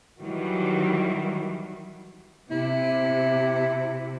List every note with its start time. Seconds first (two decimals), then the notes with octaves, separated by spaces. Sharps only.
0.20 D#3 E3 F#3 G3
2.51 C3 E4